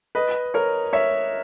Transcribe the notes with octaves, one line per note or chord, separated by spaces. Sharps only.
B4 D#5
A#4 C#5
C#5 E5